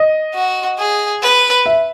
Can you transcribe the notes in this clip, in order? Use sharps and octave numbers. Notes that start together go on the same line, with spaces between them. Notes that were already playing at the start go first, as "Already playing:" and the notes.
Already playing: D#5
F#4
G#4
B4
E5